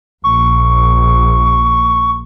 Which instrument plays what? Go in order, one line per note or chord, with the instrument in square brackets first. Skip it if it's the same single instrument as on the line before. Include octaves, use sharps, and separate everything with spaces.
[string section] A#1 [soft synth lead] C#6